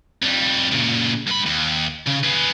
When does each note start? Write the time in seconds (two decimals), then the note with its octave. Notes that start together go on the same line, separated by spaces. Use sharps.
0.23 F2 G3
0.72 A#2 C#3
1.27 G2 B5
1.46 D#2
2.07 C#3
2.24 G#4 B4